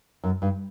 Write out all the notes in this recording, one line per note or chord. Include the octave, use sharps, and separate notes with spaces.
F#2
G2